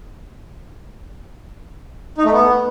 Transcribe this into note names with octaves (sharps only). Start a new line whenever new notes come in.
D#4
A3
B3